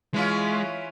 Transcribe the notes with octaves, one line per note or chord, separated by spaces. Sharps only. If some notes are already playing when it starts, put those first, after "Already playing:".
E3 G#3 C#4 F4